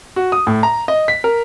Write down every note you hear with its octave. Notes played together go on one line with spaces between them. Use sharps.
F#4
D#6
A2
A#5
D#5
B6
A#4